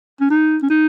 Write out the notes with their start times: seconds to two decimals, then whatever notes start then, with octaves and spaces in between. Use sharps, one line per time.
0.21 C#4
0.30 D#4
0.63 C#4
0.70 D#4